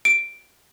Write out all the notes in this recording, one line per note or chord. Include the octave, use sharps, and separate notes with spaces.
D7